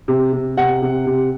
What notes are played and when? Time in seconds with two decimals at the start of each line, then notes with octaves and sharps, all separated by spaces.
0.08 C3
0.33 C3
0.57 C3 F#5
0.82 C3
1.06 C3